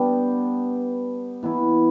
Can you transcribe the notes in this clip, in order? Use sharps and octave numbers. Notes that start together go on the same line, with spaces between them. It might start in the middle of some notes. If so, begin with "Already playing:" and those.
Already playing: G3 B3 D4 G4
E3 B3 E4